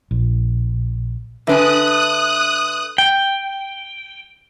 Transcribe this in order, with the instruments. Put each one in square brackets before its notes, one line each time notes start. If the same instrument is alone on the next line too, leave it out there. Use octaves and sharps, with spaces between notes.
[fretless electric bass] A#1
[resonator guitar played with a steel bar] D3 D4 G#5 [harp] B4 E5 A#6 [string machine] D#6 F#6
[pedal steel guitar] G5